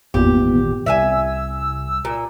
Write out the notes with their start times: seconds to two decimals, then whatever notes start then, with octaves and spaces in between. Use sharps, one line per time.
0.14 G#1 E2 A#2 B3 G4
0.86 C2 E5 F5 G#5 E6
2.05 A#2